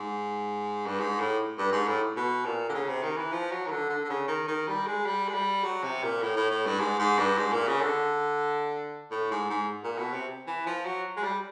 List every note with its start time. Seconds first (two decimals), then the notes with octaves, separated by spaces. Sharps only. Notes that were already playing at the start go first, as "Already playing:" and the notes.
Already playing: G#2
0.86 G2
1.00 G#2
1.20 A2
1.58 G2
1.72 G#2
1.88 A2
2.17 B2
2.46 A#2
2.69 D3
2.74 C#3
2.88 C3
3.03 D#3
3.17 E3
3.32 F3
3.51 F#3
3.67 D#3
3.71 D3
3.90 D3
4.04 D3
4.09 C#3
4.28 D#3
4.48 D#3
4.68 G3
4.87 G#3
5.06 G3
5.28 G#3
5.34 G3
5.64 F#3
5.84 C3
6.03 A#2
6.22 A2
6.36 A2
6.50 A2
6.66 G2
6.80 G#2
6.99 G#2
7.18 G2
7.38 G#2
7.53 A#2
7.67 C#3
7.81 D3
9.11 A2
9.31 G#2
9.50 G#2
9.84 A#2
9.98 B2
10.13 C3
10.47 E3
10.67 F3
10.86 F#3
11.17 G#3
11.24 G3